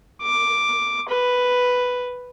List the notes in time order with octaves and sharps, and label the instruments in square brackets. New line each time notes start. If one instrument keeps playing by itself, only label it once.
[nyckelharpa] D6
B4